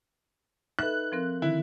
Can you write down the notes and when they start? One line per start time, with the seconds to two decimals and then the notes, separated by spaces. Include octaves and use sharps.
0.79 D#4 A4 B4 E5 F#6
1.12 F3 C4 A#4
1.42 D3 D#3 E4